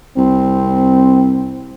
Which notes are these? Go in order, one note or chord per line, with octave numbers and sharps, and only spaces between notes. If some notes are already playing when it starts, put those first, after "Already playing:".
C2 C4